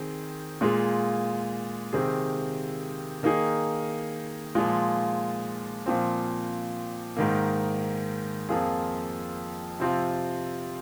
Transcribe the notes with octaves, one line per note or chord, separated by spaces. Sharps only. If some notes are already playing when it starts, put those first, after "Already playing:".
Already playing: D#3 C4 G#4
A#2 G#3 F4 G#4
C3 D#3 C4 G#4
D#3 A#3 D#4 G#4
A#2 F3 G#3 F4
A#2 F3 C4
G#2 D#3 A#3
F2 F3 A#3 F4 G#4
C3 F3 C4 F4